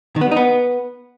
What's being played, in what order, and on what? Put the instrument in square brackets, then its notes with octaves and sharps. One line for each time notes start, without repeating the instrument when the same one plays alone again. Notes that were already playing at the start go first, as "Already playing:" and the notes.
[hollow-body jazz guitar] D#3
B3
G3
D#4
B3